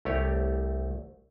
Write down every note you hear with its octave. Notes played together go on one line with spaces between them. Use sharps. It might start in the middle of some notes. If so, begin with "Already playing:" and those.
C2 A3 G4 C#5